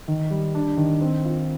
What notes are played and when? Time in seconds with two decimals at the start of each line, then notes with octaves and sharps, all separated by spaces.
0.08 D#3
0.31 G3
0.55 D4
0.77 D#3
1.01 C4
1.25 F4